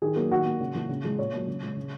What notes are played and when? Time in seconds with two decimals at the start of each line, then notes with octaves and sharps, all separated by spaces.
0.02 D#3 G#4
0.16 F#3 A#3
0.31 D#3 F#4
0.46 A#3
0.60 C#3
0.75 E3 A#3
0.89 C#3
1.04 E3 G#3
1.18 A#2 C#5
1.33 F#3 A#3
1.47 C#3
1.62 G#3
1.76 C#3